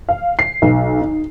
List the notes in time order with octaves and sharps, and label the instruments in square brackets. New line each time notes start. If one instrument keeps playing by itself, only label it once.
[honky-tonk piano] F5
C7
B1
D#4